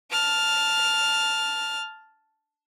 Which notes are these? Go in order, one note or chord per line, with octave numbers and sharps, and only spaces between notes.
A5 F6